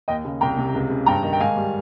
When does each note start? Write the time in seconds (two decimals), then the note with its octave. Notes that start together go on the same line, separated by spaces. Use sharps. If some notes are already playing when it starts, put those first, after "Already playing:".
0.08 D#2 D#5 G5
0.25 C#3
0.41 C2 G5 A#5
0.57 C3
0.74 C#2
0.90 C#3
1.06 G2 G5 A#5
1.23 D#3
1.33 G5
1.40 G#2 F5 G#5
1.56 G3